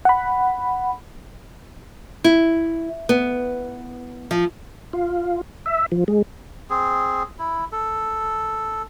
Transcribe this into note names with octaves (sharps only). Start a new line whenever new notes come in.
F#5 B5
E4
B3
F3
F4
E5
F3
G#3
C4 G#4
E4
A4